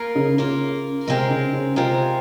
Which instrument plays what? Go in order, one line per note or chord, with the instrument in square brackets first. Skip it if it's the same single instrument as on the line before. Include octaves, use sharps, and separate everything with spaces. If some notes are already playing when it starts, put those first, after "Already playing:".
Already playing: [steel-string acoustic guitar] A#3 F4 A#4
[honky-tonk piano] C#3
[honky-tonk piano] C#3 [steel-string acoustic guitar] A#3 F4 A#4
[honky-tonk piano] C3 [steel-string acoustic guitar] G#3 C4 F4 A#4
[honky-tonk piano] C#3
C#3
[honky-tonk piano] C3 [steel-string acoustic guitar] G#3 C4 F4 A#4